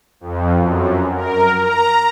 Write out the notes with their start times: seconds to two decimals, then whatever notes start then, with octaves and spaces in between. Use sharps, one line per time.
0.21 F2
0.58 F#2
1.16 A#4
1.58 A#5